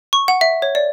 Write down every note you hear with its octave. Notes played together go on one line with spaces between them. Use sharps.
C#6
F#5
E5
C#5
D5